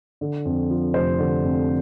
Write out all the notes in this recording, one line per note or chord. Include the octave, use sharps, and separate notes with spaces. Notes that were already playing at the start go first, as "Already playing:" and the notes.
D3
F2
F3
F1 C5
D3
F2